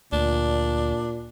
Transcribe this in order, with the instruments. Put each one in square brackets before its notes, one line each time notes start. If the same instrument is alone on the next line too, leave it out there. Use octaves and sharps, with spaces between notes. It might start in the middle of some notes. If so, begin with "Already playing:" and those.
[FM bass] D2 [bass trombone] A#2 [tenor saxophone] D4